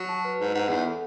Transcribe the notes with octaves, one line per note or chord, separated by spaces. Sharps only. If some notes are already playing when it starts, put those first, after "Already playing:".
Already playing: F#3
A5
B4
G#2 B4
G#2 F#5
E2 F#5
A4